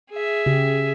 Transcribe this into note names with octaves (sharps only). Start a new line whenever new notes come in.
G#4 E5
C#3 G4